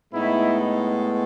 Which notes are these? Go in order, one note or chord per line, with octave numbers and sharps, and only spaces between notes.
A2 G#3 B3 D#4 E4